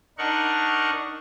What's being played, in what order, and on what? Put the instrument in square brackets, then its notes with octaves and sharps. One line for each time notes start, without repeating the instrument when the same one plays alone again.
[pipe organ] D4 D#4 A#4 F#5 C#6